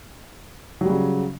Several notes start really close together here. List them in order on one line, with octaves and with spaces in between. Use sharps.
F#3 G3 C#3